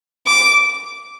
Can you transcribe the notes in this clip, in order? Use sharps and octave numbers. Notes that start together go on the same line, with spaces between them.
D6